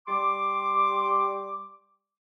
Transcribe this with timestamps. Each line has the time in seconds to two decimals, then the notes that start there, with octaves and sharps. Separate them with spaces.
0.08 G3 C6 D6